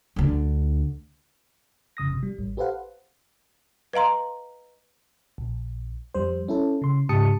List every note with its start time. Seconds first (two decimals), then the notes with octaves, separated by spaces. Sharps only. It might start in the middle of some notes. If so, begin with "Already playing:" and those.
0.16 D2 D3
1.97 F2 C#3 D#6 A#6
2.09 G#1 C3
2.23 G3
2.39 A1
2.57 G4 A4 B4 C5 F5 F#5
3.93 B4 D#5 F5 A#5 C6
5.38 A#1
6.15 F2 G3 C5
6.48 C#4 E4 A4
6.82 C#3 C6
7.09 G#2 C#3 G4 A5 D#6 C#7